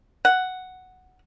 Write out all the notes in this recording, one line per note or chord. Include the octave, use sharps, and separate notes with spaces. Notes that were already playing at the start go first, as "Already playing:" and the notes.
F#5